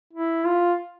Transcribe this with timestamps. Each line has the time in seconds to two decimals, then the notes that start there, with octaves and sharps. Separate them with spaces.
0.13 E4
0.45 F4